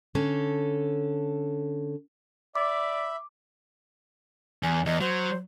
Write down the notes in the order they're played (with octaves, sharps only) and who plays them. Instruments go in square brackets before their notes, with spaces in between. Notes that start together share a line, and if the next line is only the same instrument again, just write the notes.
[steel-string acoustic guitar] D3 C#4 A4
[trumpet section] D5 [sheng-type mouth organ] E5 B5 [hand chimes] D6
[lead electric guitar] E2 [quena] G#5
[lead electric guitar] E2 [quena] D#5
[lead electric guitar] F#3 [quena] C5